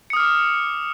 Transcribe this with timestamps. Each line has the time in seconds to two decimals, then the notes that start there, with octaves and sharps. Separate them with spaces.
0.10 C#7
0.13 D#6
0.16 F6
0.20 D6